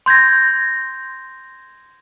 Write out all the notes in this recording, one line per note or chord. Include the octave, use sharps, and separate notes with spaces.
C6 G6 G#6 A#6